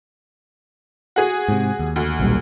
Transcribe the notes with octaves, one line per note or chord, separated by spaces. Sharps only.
F#4 G#4
G#2 C3
D#2
D2
B1 A#2 G3